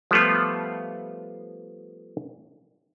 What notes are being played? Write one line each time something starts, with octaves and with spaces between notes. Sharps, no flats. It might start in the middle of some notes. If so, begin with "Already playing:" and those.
F3 G3 A3 B3 F4